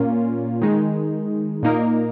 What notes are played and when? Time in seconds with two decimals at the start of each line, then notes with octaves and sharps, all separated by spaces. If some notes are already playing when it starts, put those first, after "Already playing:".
Already playing: A#2 A#3 C#4 F4
0.62 D#3 G#3 D#4
1.63 A#2 A#3 D#4 A#4